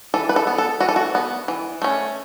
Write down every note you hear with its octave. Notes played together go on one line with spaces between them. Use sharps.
E3 A4
B4
A4
B3
A4
E3 F#4
A4
F#4
B3
E3
A3 C#4